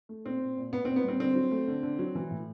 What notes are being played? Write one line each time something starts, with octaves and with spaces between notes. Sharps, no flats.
A3
A#2 C4
A#2
A#2
A#2 B3
C4
A#2
B3
G3 C4
D3 C4
F#3
A3
D3
D3
F#3
E3
A2